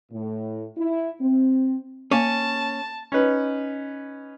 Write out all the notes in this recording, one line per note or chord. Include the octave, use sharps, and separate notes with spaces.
A2
E4
C4
A#3 C#4 A5
C#4 D#4 B4